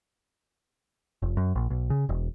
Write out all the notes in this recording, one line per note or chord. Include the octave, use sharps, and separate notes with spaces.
F1
F#2
A#1
B1
C#3
E1